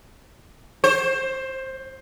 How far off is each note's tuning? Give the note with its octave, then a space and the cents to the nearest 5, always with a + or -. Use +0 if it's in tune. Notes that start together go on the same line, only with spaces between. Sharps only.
C5 +15